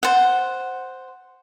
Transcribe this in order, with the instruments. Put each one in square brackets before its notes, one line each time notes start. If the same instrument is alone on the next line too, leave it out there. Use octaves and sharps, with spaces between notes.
[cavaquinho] C5 F#5